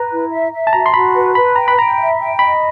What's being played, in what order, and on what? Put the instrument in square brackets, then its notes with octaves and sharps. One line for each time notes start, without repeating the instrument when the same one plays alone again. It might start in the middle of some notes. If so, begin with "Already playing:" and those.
Already playing: [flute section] B4 [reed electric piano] A#5
[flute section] E4
E5
E5
[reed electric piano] A5
[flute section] F#4 [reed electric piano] A#5
[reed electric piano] C6
[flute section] F#4 [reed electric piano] B5
[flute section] B4
[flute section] B4 [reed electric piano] B5
[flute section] G5 [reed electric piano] A#5
[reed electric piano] B5
[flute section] G5 [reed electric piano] A#5
[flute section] E5
G5
[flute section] D#5 [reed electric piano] B5